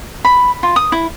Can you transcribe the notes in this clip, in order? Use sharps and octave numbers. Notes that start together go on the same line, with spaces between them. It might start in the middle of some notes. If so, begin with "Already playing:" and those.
B5
F4
D#6
E4